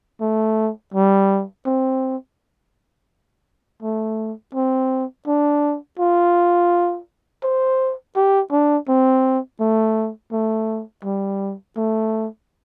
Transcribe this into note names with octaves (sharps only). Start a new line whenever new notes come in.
A3
G3
C4
A3
C4
D4
F4
C5
G4
D4
C4
A3
A3
G3
A3